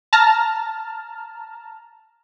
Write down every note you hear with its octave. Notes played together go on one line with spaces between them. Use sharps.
A5 A#5 F6